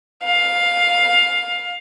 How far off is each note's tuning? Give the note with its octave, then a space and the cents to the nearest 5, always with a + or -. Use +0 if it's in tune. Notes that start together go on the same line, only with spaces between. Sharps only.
F5 +10